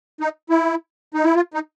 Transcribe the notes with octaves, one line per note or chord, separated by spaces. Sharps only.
D#4
E4
D#4
E4
F4
D#4